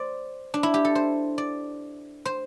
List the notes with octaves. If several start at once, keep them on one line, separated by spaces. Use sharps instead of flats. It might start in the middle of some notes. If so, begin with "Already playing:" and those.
Already playing: C5 D5
D4
E4
G4
A4
C5
D5
C5